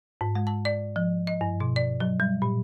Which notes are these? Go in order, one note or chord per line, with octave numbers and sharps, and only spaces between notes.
G#2
G#3
A5
D5
F3
D#5
G2
B2
D5
F#3
G3
A#2